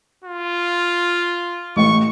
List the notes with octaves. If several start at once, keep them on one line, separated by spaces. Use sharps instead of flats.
F4
A1 A2 C#6